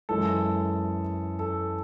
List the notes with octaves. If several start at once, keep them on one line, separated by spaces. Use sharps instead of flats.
F#2 E3 G#3 A4
A4